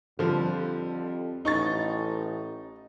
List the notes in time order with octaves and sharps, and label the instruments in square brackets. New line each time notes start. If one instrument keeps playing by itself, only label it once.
[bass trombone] F2 [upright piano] D3 F3 G3
[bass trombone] A1 [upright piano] D#4 C#6 A6